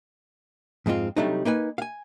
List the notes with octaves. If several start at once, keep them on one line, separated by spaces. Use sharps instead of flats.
F2 G#2 G#3 C4 F4
C3 F#3 G3 A3 D4 D#4
A#3 D#4 B4 G#5
F5 G#5